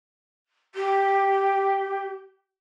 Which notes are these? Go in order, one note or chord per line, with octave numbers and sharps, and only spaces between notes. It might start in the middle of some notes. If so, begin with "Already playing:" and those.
G4